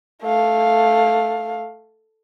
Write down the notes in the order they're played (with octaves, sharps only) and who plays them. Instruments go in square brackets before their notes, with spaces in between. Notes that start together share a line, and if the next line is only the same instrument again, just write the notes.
[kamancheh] A3 F5